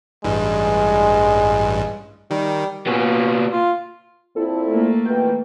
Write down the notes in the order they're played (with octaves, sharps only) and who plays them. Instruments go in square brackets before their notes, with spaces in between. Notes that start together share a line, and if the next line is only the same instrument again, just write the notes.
[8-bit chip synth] A1 G2 [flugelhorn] G#3
[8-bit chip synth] D#3 [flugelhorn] G3
[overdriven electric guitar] A#2 B3 [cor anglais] C#4
[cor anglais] F4
[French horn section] A#2 C4 E4 [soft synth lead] A4
[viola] A3 A#3
[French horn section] F2 B2 E3 [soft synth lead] G5